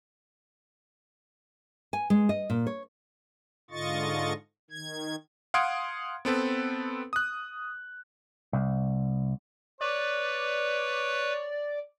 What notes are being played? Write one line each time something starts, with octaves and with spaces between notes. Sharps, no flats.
G#5
G#3
D#5
A#2
C#5
G#2 D3 F4 D#5 C#6 A6
D#3 G#6
F5 F#5 C6 D#6 G#6 D7
B3 C4 A4 B4
D#6 F#6
C2
B4 C#5 D5